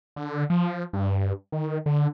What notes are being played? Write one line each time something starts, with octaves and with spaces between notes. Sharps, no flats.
D3
F3
G2
D#3
D3